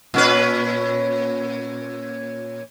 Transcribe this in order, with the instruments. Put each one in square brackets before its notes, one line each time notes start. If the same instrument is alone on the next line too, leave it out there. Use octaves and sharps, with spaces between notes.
[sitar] A#2 C#4 B4